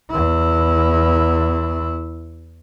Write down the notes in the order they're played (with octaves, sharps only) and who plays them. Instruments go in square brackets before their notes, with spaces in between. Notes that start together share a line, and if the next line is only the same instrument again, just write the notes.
[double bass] E2 E4